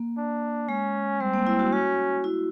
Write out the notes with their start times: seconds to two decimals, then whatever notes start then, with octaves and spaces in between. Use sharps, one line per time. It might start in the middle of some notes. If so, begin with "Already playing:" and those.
Already playing: A#3
0.18 D4
0.69 G#3 C#4
1.21 G3 C4
1.34 A#3
1.47 E4
1.59 F#4
1.72 C#4 F#4
2.24 E4